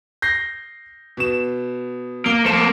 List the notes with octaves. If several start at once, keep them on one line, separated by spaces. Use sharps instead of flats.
G6 A#6 C7
B2 E7
A#3 G7
F3 A3 A#3 C5 E7